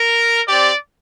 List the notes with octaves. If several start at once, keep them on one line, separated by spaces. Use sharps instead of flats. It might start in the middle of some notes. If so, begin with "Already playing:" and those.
Already playing: A#4
C4 G4 D5